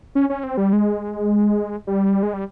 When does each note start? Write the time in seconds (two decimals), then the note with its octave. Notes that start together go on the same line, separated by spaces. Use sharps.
0.15 C#4
0.30 C#4
0.43 C4
0.57 G3
0.73 G#3
1.87 G3
2.23 G#3
2.34 G3